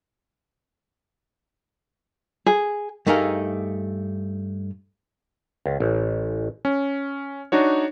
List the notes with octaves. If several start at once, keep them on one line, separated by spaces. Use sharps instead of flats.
G#4
G2 A3 D#4 G#4 A#4 F5
C#2
A1
C#4
D4 D#4 F#4 C#5